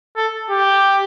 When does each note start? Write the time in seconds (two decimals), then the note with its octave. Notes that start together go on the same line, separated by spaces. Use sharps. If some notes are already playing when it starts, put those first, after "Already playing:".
0.17 A4
0.50 G4